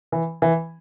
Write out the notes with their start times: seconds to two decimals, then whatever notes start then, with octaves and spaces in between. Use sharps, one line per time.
0.12 E3
0.42 E3